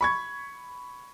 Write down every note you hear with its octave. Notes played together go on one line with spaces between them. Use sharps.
B5 C#6 G#6